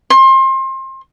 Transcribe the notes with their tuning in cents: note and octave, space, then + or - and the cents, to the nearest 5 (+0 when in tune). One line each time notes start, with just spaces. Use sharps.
C6 +30